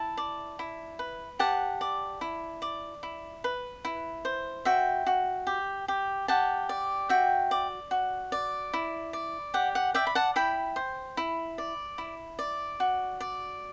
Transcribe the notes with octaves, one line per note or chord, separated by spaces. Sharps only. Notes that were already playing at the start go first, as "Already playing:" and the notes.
Already playing: E4 A5
D5
E4
B4
G4 F#5 A5
D5
E4
D5
E4
B4
E4
C5
F#4 E5 G5
F#4
G4
G4
G4 F#5 A5
D5
F#4 E5 G5
D5
F#4
D5
E4
D5
G4 F#5
F#5
D5 E5 G5
B5
F#5 A5
E4 G5 B5
C5
E4
D5
E4
D5
F#4
D5